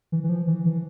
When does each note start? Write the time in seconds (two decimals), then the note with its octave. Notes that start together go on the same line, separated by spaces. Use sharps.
0.12 E3
0.24 E3
0.29 F3
0.47 E3
0.65 E3